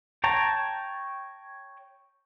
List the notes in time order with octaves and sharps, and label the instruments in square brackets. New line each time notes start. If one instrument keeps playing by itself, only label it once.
[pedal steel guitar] C#5 G5 A5 A#5